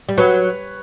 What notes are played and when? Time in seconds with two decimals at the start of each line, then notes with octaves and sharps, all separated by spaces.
0.09 G3
0.18 F#3 B4 C#5